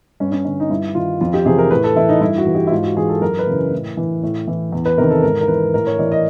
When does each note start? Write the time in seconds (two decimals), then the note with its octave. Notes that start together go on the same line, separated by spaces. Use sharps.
0.20 G2 C#4
0.32 C#4
0.45 D3 C#4
0.60 D#4
0.70 G2 E4
0.95 D#3 F4
1.21 F2 F4
1.34 G4
1.45 C3 E3 G#4
1.58 A#4
1.71 A2 B4
1.84 A4
1.96 E3 E4
2.09 D#4
2.21 G2 E4
2.38 F#4
2.47 E3
2.55 G4
2.67 E4
2.71 G#2 F4
2.84 F#4
2.97 E3 G#4
3.09 A4
3.21 F#2 A#4
3.39 B4
3.47 C#3 E3
3.73 A2
3.97 E3
4.23 A2
4.47 E3
4.72 E2
4.85 B4
4.98 C3 D#3 A#4
5.10 A4
5.23 G#2 A#4
5.41 A#4
5.48 E3 B4
5.74 A2 A#4
5.87 C#5
5.99 E3 D5
6.12 D#5